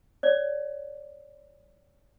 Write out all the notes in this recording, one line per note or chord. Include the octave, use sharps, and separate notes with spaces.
C#5 D5